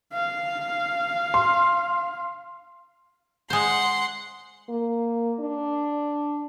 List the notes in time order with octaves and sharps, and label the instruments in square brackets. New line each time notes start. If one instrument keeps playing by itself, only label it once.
[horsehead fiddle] F5
[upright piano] C6
[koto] G#3 C5 [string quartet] F#5 C6
[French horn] A#3
D4